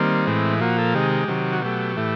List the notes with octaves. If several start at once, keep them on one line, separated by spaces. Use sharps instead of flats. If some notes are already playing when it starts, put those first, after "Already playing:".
Already playing: D#3 G3 A#3 C4
A2 E3 G#3
A#2 F3 A#3 F#4
A4
C3 D#3 G#3 G4
C3 D#3 F#3
F#4
B2 F#3 A3 G4
A2 E3 A3